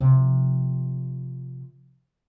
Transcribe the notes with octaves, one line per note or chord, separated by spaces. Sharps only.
C3 F3